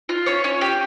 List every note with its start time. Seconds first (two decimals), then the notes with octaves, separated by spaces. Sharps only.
0.09 F4
0.26 C#4 C#5
0.44 C#4
0.61 G4